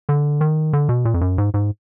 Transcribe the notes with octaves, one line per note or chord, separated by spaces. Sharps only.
D3
D#3
D3
B2
A#2
F2
F#2
G#2
G#2